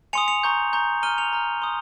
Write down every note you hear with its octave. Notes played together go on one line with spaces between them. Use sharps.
G#5 C6 D#6 C#7 F7
C#7 F7
A#5 C#6 G6
A#5 C#6 G6
A#5 F6 D#7 G7
C#7 F7
A#5 F6
C6 D#6 G6